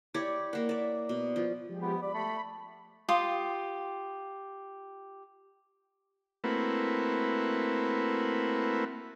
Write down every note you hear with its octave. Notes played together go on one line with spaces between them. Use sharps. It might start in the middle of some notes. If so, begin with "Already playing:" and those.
E4 G4 C#5 D5
A#3 F#5
D5 E5
B2
F3
F3 G#3 G4
B3
D5 B5
A3
F4 G4 C6 D#6
A3 A#3 C4 E4 F#4 B4